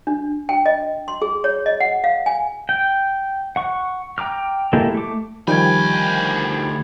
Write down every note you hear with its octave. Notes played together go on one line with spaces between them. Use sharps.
D4
G5
D#5
C6
G#4
C#5
D#5
F#5
F5
G#5
G5
F#5 C#6
G5 A#5 D6 F6
G#3 A#3 E4 G4 A4
A3 D6
D2 D#3 F3 G3 G5 G#5 B5 G#6